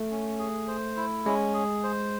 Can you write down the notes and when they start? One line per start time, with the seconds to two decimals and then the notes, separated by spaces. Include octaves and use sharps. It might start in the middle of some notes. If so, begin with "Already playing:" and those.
Already playing: A3
0.10 C#4
0.39 G#4
0.68 C5
0.97 E4
1.26 G#3 C#4
1.54 G#4
1.84 C5